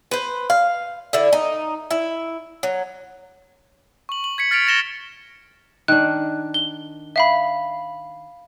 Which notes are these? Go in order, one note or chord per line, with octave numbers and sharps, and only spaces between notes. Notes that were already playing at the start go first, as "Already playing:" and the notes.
B4 C5
F5
D3 E4
D#4
E4
F#3
C#6 F#7
F#7
G#6 B6 C#7 F#7
F6 A6 B6 C#7 D7 F7
A6 A#6 E7 G7
D#3 D4 F#6
G7
E5 F5 B5